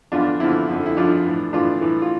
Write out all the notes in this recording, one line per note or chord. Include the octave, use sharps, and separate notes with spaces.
E2 D3 F3 D4 F4
E2 D3 F3 C4 E4
F2 D3 F3
E4
F2 D3 F3 D4 F4
A2 E3
A2 E3 D4 F4
A2 E3
F4